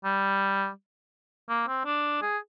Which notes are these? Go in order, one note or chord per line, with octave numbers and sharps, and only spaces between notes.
G3
A#3
C4
D4
G#4